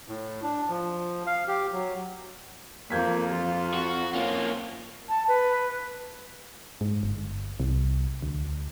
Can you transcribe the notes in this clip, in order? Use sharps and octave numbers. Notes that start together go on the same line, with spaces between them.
A2
D4
F3
F5
G4
F#3
F2 A#3 G6 G#6 B6
F3 F4
F#4
A#3 C#4 F4
A5
B4
G#2
G1
C2
D2